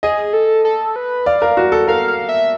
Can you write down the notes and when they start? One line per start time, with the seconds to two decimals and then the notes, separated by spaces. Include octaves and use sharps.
0.03 G#4 D#5
0.33 A4
0.65 A4
0.96 B4
1.26 D5 F5
1.42 A#4
1.57 F#4
1.72 A4
1.88 A#4 F5
2.08 F5
2.29 E5